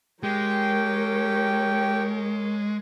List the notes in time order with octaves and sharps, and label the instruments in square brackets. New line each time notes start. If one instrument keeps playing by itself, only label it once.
[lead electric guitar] G#3 [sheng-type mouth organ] G4 G5 [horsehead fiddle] A#4 C#5